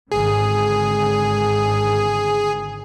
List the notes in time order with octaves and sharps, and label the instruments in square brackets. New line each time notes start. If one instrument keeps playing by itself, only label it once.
[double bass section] G#1 D3 [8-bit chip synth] G#4